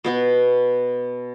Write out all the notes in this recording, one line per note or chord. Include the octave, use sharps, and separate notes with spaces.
B2 B3 F#4